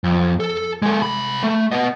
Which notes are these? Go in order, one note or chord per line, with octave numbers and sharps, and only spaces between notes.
F2
A4
G#3 A4
C2 B5
A3
B3 D#5